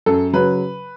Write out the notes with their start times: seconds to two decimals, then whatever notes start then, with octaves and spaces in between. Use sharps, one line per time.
0.06 F#2 A4
0.33 C#3 F#3 B4